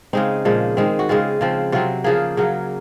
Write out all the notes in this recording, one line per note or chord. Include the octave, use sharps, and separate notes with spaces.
C#3 G#3 C4 D#4
A#2 F3 G#3
D#3 G#3 C4
F#4
C#3 G#3 C4 F4
C#3 F3 C4
C3 F#3 C4 F4
C#3 F3 A#3 G#4
C#3 F#3 A#3